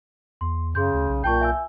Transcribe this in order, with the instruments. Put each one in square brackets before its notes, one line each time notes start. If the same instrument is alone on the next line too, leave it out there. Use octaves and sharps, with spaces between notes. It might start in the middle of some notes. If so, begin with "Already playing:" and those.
[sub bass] E2 [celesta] C6
[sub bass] F#2 [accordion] C#3 [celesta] G#4 C6 G6
[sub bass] D2
B1
[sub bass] B1 [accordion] A#2 G6 [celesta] G5 A5 C#6
[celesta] E5 G#5 E6